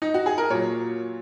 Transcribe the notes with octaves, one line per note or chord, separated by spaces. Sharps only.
D#4
F#4
G#4
A#4
A#2 F#3 C#5